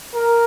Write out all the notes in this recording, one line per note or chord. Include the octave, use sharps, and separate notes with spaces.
A#4